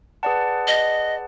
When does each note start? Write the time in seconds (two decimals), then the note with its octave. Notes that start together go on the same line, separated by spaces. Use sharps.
0.23 G#4 B4 D5 F#5 A5
0.67 D#5